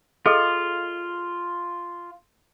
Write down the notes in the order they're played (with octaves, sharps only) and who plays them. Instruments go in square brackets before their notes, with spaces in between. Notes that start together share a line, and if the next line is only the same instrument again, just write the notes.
[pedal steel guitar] F4 [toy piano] G#4 A4 D#5